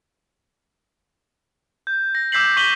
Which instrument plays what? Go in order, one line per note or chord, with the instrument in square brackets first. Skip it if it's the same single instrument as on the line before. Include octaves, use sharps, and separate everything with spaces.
[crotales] G6
A#6
D6 E6 G6 B6 C7 F#7
C#6 B6 D#7 F#7 G7